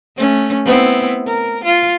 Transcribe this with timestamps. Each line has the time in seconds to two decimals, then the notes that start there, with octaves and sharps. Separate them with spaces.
0.17 A3 C#4
0.65 B3 C4 E4
1.27 A#4
1.64 F4